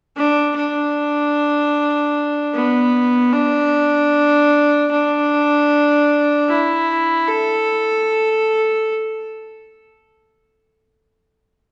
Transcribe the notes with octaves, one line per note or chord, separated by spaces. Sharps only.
D4
D4
B3
D4
D4
E4
A4